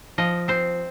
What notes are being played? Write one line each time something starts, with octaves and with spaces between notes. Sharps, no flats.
F3 D#5
C4 C5